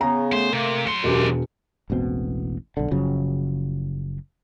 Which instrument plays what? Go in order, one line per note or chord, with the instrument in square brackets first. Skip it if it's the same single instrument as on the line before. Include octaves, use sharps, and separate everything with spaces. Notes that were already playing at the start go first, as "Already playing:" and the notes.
[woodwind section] C#3 B3 [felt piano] A#5
[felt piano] A3 [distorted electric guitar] C5
[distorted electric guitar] C3 [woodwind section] A#3
[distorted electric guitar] F#3 C6 [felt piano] C#7
[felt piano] E1 F#4 [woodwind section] F#2 B2 G4
[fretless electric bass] E1 A1 B2 C4
B1 D3
F#1 C#3 F3 F#3